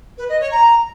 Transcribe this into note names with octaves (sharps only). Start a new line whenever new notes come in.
B4
D#5
C#5
A#5